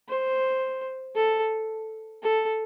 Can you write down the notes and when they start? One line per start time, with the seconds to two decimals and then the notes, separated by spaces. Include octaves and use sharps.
0.08 C5
1.16 A4
2.23 A4